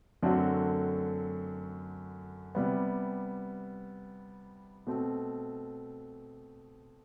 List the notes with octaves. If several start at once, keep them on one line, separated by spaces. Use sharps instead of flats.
F#2 D3 A3 C4 F#4
C3 G3 B3
B2 A3 C4